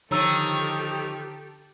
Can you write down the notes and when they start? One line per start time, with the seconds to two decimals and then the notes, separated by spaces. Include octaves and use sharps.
0.11 D3 D#3 F3 G4 A4 C#5 A#5 E6